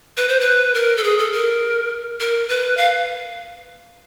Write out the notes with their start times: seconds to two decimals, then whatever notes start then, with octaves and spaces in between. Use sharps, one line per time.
0.17 B4
0.28 C5
0.40 B4
0.74 A#4
0.97 A4
1.03 G#4
1.18 A4
1.32 A#4
2.20 A#4
2.49 B4
2.77 F5